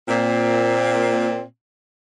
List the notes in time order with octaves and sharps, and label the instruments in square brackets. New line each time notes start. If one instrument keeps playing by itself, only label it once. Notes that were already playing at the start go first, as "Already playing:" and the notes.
[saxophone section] A#2 C4